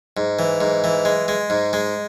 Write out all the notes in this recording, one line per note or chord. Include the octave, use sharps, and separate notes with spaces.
G#2
E3
G#2
E3
G#3
G#3
G#2
G#3